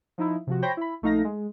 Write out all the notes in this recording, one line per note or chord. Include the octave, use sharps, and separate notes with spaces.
F3 D#4 E4
C3 F3 F#4
C5 C#5 G5 B5 G6 A#6
E4 B5
A#1 A3 D#4 F5 A#6
G#3